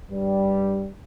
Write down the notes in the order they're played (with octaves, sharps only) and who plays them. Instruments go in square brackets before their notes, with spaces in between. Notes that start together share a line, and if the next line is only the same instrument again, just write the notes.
[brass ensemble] G2 G3